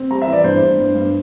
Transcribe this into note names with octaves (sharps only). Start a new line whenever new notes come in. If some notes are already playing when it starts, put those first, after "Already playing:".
Already playing: C4
G3 A#5
E5
E3
D5
G2 C5
G2
G2
G2